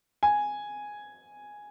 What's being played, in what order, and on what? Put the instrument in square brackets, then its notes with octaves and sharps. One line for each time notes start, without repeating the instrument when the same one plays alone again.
[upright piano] G#5